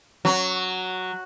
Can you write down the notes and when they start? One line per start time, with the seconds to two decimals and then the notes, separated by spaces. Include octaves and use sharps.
0.25 F#3